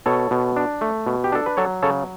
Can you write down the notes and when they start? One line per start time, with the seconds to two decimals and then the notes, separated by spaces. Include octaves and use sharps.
0.06 B2 A4 C#5
0.31 B2
0.56 D4
0.81 A3
1.07 B2
1.24 G4
1.32 D4 A4
1.46 B4
1.57 F#3 A4 C#5
1.83 C#3 A4 C#5